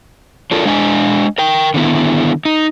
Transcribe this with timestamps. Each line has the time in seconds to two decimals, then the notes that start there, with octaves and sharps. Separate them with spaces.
0.51 D4 F4 A4 A#4
0.65 G#3 D4 D#5 F5 G#5
1.38 A#4 G5
1.74 D3 D#3 B3 E4
2.45 D#4